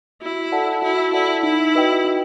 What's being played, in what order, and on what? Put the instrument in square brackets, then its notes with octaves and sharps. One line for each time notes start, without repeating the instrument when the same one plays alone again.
[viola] E4 [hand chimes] F#4
[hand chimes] A4 D5 F#5 A5
[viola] E4 [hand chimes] F#4
[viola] E4 [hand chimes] A4 D5 F#5 A5
[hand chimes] D#4 [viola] E4
[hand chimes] F#4 B4 D#5 G5
D#4